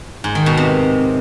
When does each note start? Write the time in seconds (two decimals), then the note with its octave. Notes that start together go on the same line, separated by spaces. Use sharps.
0.24 G#2
0.35 D#3
0.46 B2
0.57 C3